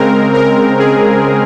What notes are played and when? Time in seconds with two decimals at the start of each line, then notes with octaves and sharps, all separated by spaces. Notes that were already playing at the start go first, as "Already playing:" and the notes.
Already playing: C#3 G#3 C4 A#4
0.34 A#4
0.79 G#4